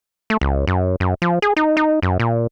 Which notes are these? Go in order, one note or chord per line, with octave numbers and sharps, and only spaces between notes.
A3
C#2
F#2
F#2
F3
G#4
D#4
D#4
F#2
A#2